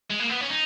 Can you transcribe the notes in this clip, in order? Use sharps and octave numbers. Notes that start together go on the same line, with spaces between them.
G#3
A#3
B3
C#4
D#4